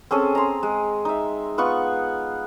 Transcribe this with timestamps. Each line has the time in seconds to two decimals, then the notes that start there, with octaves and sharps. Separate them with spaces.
0.11 C4 C#4 G#4 A4
0.35 A#5 C6
0.63 G#3
1.05 D#4 E5
1.58 B3 F4 F#5 C#6